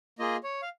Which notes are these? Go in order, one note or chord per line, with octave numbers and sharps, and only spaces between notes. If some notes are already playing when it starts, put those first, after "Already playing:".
A#3 F4 G#4 D#5
C#5
F5